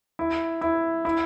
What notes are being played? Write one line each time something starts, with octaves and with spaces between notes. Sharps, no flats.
E4
E4
E4